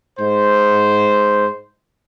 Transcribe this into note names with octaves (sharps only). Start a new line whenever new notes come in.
G#2 C5